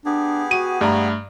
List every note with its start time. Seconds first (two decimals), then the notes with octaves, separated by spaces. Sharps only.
0.06 B3 D4 G4 G#4
0.51 F#4 D#7
0.81 G2 A3 A#5 B5